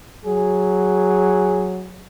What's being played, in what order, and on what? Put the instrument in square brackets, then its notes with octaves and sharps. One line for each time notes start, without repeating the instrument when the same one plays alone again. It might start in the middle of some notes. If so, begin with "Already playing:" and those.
[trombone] F#3 [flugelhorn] G#4